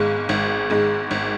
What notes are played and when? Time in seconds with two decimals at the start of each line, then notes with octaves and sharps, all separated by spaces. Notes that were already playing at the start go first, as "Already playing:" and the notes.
Already playing: G#1 G#2 G#3 F5
0.29 G#1
0.70 G#2 G#3
1.11 G#1